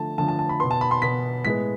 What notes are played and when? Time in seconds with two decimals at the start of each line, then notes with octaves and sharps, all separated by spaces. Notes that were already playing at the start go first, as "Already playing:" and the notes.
Already playing: D3 F3 A3 A5
0.18 D3 F3 A3 A5
0.28 A5
0.39 A5
0.49 B5
0.60 B3 C6
0.64 B2
0.71 A5
0.81 B5
0.91 C6
1.02 B2 B3 B6
1.45 A2 G#3 B3 B6